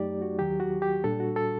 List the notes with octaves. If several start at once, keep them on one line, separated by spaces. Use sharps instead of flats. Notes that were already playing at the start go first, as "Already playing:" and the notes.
Already playing: F#2 F#3 A3 D#4 G4 D5
F#4
D#2 D#3 F#3 G4
F#4
G4
A#2 G3 D4 A4
F#4
A4